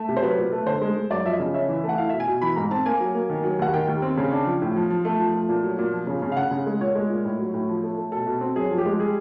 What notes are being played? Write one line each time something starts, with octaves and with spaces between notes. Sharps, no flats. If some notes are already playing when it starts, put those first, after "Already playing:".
Already playing: A3 E5
C3
C5
F#3 B4
A#2
A3
D3 C5
G#3
G#3
F#2 D5
F3 E5
D#5
C#3
C#4 E5
E3
A3
F#5
E4 F5
B2 E5
G#5
B2
E3 B5
G#2 A#5
C4 A5
A#3 G#5
F#3
A#3
D#3
F#3
D#2 F#5
D#3 G5
D#2
C4
C#3
D4
F3
A2
F3
F3
A3
F3
A3
A#2
F#3
A#2
F3
C#3
C#3
F5
C#3 F#5
C#3
G#3
A#2 C#5
G#3
A#2
A2
F#3
A2
F3
A3
A3
B2 A4
B2
C4
F#2 G#4
F3
G4
G#3
G3 G#4